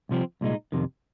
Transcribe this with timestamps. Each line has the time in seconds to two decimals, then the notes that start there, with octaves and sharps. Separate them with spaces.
0.09 C2 C3 F3 C4
0.41 C2 A#2 G#3 D#4
0.72 F2 C3 D#3